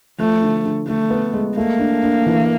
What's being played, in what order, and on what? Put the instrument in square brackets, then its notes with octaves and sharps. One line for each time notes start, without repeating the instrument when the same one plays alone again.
[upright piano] F3 [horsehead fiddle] A3
[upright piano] D3
D3
[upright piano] D3 [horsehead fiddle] A3
[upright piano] B3
G#3
[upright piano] A3 [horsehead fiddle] A#3
[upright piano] D4
D4
E3